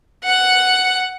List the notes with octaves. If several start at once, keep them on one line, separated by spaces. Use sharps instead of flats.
F#5